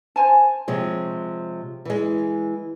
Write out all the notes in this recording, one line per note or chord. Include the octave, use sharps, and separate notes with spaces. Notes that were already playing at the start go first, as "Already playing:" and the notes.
C5 G#5 A5
C3 F3 G#3 C#5
E3 G#3